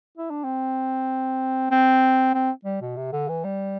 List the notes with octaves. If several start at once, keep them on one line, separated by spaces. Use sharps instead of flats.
E4
D4
C4
C4
C4
G3
B2
C3
D3
E3
G3